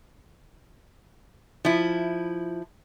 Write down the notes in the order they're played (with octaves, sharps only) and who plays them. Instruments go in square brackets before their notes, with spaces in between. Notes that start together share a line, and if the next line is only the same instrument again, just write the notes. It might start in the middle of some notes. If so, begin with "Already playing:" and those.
[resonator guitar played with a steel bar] F3 E4